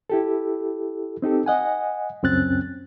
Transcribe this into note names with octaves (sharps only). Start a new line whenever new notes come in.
E4 G4 A4
C4 D#4 G4 A4
D#5 F#5 G#5
C#2 F#2 C4 C#4 F#6 A6